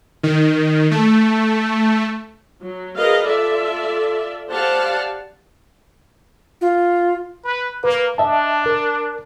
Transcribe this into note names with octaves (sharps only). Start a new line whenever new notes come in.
D#3
A3
F#3
G#4 A#4 B4 D#5 F5
F4 A4 D5 E5
G4 C5 D5 F5 F#5 A5
F4
B4
A#3 B4
D4 D#5 E5 A5
A#4